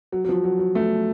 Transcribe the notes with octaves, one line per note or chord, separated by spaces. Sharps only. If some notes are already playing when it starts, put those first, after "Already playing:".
F#3
F#3
F3
F#3
F#3
A3